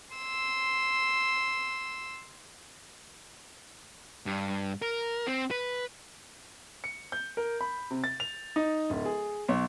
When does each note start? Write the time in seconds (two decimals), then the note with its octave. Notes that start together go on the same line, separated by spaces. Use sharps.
0.16 C6 E6
4.26 G2
4.82 A#4
5.27 C4
5.51 B4
6.84 C#7
7.12 G6
7.37 A#4
7.61 B5
7.91 C3
8.04 A6
8.20 F7
8.56 D#4
8.90 D1
9.06 G#4
9.48 B1